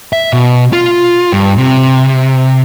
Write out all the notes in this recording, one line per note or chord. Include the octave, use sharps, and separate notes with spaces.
E5
B2
F4
G2
C3